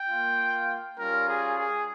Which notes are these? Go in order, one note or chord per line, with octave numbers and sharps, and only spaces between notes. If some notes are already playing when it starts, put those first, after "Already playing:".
Already playing: G5
A#3 F4
G3 C#4 F4 A#4
G#4
G#4